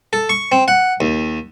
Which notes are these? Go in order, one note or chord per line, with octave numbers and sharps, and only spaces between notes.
A4
C#6
C4
F#5
D#2